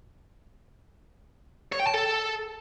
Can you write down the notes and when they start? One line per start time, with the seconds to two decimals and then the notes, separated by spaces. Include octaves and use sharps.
1.73 C#5
1.80 G5
1.87 A5
1.94 A4